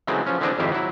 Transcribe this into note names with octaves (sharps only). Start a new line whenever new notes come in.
C#3 E3 F#3 G#3 A3 C4
F3 C#4
D3 E3 G#3 C4 D4 D#5
G#1 F2 D#3 E4 G4 C5
F#3 E4